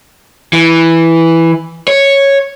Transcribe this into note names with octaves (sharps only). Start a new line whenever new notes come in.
E3
C#5